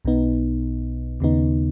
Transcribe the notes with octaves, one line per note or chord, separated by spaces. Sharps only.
B1 B2 B3 D#4
D#2 C#3 B3 D#4